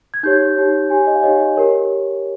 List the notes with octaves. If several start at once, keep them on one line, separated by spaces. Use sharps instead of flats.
G#6
D#4 G4 C#5 G6
D#4 G4 C#5
D#4 G4 C#5 G#5
D#5
F5
D#4 G4 C#5 D#5
G4 A#4 C#5